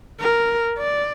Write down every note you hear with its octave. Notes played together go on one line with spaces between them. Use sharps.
A#4
D5